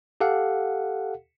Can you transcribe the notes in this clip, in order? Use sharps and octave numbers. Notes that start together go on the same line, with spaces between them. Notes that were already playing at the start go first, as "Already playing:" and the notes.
G4 A4 F5 F#5